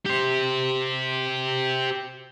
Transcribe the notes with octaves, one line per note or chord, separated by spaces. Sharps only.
G4 C5